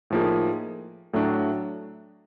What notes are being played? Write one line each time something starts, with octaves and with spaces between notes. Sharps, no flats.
A2 F3 A#3 D#4 G#4
A2 F#3 A3 D4